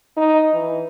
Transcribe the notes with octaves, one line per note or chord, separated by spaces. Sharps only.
D#4
E3